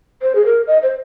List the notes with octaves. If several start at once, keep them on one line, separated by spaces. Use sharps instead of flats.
C5
G#4
A#4
D#5
C5